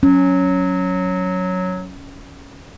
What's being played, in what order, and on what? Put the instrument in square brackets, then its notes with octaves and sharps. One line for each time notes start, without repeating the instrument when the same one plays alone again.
[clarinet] F#3 [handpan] C#4